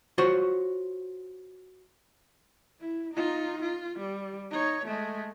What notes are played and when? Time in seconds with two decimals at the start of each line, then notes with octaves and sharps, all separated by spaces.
0.18 F4 F#4 C5 C#5
2.80 E4
3.14 D#4 F4
3.62 F4
3.99 G3
4.51 D#4 C#5
4.85 G#3 A3